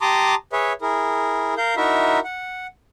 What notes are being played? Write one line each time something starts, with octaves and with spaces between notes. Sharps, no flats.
G4 A5 A#5 C6 D6 D#6
G#4 B4 C#5 E5
E4 G#4 A#4
A#4 F5 G6
D#4 E4 F#4 A#4 E5
F#5